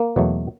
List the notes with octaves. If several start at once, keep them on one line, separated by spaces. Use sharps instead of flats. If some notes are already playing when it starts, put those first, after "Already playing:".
Already playing: A#3
E2 B2 F#3 A3